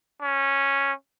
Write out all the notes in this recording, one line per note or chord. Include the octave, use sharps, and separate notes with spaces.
C#4